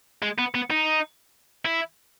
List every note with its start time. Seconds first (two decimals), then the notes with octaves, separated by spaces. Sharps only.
0.23 G#3
0.39 B3
0.55 B3
0.71 D#4
1.65 E4